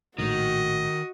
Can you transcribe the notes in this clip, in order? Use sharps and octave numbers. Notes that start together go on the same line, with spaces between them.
A#1 A2 D#3 F#4 D#5